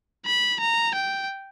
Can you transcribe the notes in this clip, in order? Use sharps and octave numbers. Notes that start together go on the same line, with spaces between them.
B5
A#5
G5